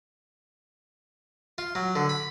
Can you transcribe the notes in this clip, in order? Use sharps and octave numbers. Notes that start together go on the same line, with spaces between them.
F4
F#3
D3
B5